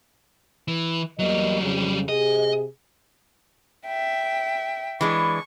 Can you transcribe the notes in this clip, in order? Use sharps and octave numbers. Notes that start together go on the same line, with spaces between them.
E3
E2 F#3 G3 A#3 D#5
F2 C#3
C3 G#4 D#5
E5 G5
E3 G#3 D4 C#6